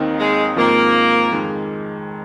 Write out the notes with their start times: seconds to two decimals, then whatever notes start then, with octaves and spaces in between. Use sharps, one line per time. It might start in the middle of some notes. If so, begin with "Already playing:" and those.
Already playing: D#2 D#3 C4 D#4
0.19 G#3
0.56 G#2 F3 A#3 C4 F4
1.32 F2 D#3 G#3